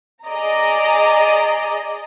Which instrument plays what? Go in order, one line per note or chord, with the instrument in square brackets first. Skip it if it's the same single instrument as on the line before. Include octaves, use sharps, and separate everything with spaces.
[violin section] G#4 D5 D#5 A#5